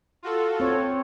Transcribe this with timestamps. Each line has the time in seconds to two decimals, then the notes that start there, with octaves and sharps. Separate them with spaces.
0.23 F4 F#4 A4
0.60 C4 C#5